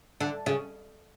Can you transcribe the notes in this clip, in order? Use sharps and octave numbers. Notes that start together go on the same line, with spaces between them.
D3
C#3